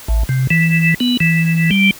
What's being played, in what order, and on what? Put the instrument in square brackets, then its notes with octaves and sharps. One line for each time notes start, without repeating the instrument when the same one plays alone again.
[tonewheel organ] A1
C3
E3
B3
E3
G3